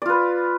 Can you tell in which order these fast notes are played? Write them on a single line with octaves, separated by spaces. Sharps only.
D5 F4 B4